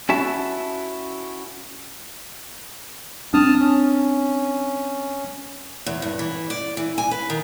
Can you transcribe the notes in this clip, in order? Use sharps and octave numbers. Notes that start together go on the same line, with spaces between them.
C#4 E4 F#4 E5 A5
C4 D4 A5 D#6 F6
C#4
E2
G2
E3
D5
E3
G#5
B4
D#3